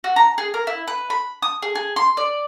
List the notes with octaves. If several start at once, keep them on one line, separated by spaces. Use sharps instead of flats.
F#4
A#5
G#4
A#4
E4
B4
B5
D#6
G#4
G#4
C6
D5